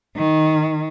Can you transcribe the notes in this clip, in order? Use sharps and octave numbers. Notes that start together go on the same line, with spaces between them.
D#3